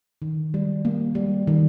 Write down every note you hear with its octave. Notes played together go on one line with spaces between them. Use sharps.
D#3
G3
A#3
G3
D#3